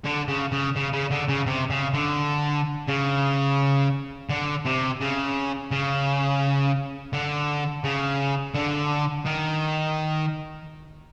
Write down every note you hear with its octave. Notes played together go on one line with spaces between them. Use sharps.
D3
C#3
C#3
C#3
C#3
D3
C#3
C3
C#3
D3
C#3
D3
C3
C#3
C#3
D3
C#3
D3
D#3